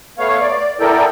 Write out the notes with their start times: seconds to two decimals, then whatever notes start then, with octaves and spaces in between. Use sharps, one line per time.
0.18 A3 B3 C#5 F5
0.40 D5
0.80 B3 E4 A4 A#4 D5 G5